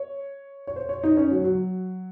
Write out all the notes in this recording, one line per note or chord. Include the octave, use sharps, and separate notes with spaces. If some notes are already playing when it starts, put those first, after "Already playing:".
Already playing: C#5
C#5
C5
C#5
D#4
C#4
F#3
F#3